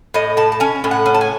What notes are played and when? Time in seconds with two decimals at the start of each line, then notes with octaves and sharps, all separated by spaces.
0.14 A2 D#5
0.37 A2 A5
0.52 A5
0.60 C#4 G#5
0.84 A2
0.91 F#5
1.06 C#4
1.15 A5
1.21 G#5